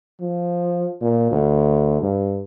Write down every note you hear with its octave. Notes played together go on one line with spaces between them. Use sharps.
F3
A#2
D2
G2